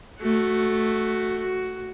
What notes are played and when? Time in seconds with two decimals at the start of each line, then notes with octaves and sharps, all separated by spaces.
0.19 A3 F#4
1.40 F#4